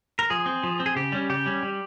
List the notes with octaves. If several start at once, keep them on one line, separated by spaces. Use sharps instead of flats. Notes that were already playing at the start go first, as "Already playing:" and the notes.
A#4
F3 G#4
C4
F3
C4
G#4
C#3 G4
G3 C#4
C#3 G4
G3 C#4
G3